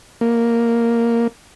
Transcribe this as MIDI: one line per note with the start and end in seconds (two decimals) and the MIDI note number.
0.21 1.27 58